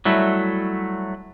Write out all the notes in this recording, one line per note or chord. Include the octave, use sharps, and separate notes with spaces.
F#3 G3 A3 E4